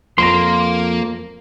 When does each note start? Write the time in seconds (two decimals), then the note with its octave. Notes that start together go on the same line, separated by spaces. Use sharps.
0.18 F2 F3 A#3 A#5 C6